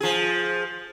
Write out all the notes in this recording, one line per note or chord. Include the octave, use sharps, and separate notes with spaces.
F3 G#4